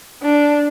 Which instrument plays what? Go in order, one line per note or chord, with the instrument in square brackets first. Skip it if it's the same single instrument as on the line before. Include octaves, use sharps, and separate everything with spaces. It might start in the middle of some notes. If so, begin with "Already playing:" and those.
[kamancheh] D4